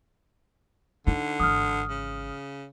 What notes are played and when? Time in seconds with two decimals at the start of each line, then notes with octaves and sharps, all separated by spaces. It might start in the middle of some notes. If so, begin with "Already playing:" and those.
1.07 D3 D#4 F4
1.40 G#1 E3 D#6 F6
1.89 C#3